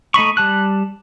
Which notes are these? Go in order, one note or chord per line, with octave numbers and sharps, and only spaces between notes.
A3 D#4 B5 C#6
G3 A5 F#6